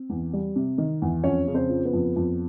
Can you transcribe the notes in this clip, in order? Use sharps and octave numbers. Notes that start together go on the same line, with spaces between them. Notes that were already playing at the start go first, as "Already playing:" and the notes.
Already playing: C4
E2
G3
C3
D#3
E2
F2 C#4 C#5
C#3
C4 C5
F3
B3 B4
F2
F2